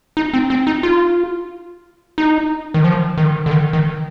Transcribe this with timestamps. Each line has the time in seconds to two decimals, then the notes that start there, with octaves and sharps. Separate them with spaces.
0.17 D#4
0.34 C4
0.50 C4
0.67 D#4
0.83 F4
2.18 D#4
2.74 D#3
2.84 F3
3.17 D#3
3.46 D3
3.51 D#3
3.73 D#3